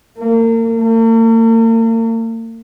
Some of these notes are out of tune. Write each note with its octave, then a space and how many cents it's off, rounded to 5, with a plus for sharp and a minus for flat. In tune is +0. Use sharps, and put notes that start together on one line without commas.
A#3 -35
A#3 -45